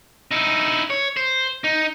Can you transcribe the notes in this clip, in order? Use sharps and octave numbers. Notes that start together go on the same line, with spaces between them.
D#4 E4
C#5
C5
D#4